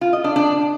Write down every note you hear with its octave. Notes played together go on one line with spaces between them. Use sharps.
F4
D#5
D4
D4